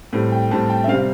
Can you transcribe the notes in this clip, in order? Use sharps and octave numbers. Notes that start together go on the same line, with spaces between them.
A2 G3 C4
G5
A2 G3 C4 A5
G5
E5
C3 G3 C4 F5